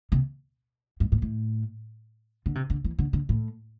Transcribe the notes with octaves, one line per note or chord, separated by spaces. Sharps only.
C3
G2
A2
A2
D3
C3
D3
E3
D3
D3
A2